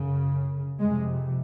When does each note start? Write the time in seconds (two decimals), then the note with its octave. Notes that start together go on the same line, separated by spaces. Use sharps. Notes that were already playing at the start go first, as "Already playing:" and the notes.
Already playing: F#2 C#3
0.80 F2 C3 G#3